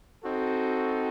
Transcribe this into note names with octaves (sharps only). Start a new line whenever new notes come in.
C4 D#4 F#4 A4